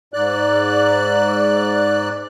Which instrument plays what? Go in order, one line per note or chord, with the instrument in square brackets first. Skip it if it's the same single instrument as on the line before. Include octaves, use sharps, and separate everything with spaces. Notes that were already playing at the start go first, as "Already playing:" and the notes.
[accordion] G#2 D5 F#6